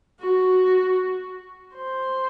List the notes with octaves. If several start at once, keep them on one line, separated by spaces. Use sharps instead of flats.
F#4
C5